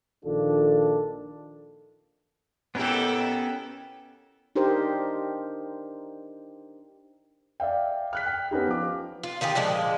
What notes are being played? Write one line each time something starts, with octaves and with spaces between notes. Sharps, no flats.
A#1 D#3 D4 F4 A4
A#2 B3 C#4 E4 G4 A4 A#4
D4 D#4 G4 A#4 C5
D5 E5 F5 G5
F6 F#6 B6
G5
B3 C#4 D#4 G4
F3 D6
F4
D#3 F4 G4 G#4
A#2 D3 F3 G#3